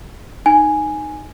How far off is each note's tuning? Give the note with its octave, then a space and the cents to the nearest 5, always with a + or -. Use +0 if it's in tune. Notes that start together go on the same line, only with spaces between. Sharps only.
D#4 -15 G#5 +0